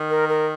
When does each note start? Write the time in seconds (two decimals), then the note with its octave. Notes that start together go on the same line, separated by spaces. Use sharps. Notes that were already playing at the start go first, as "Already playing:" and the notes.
Already playing: D#3
0.10 A#4
0.29 A#4